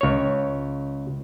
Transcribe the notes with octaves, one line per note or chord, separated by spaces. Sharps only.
C#2 C#5